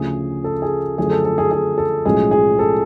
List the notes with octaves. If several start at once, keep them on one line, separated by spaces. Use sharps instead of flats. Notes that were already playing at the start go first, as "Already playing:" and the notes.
Already playing: D2 C#3 F3 G#4
A4
G#4
F#2 D3 F3 A3 G#4
A4
A4
G#4
G#4
A4
B1 A2 F3 G#3 C#4 G#4
G#4
A4